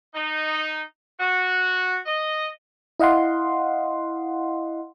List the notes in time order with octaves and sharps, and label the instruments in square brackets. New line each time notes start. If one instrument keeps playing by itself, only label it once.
[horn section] D#4
F#4
D#5
[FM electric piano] E4 D#5 F5 F#5 C6